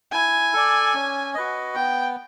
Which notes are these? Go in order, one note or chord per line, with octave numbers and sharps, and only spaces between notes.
E4 G#5
A4 D5
C#4
F#4 B4 D#5
B3 G5